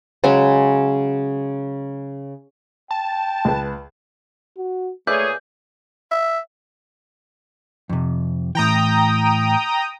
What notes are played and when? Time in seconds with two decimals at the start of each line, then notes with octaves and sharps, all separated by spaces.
0.24 C#3 F#3 G#3 G#5
2.91 G5 A5
3.45 C#2 B4
4.57 F#4
5.07 A#2 A3 G#4 B4 C#5 D5 E5 G6
6.11 E5
7.89 F2 C3
8.55 A2 E3 G5 A#5 D#6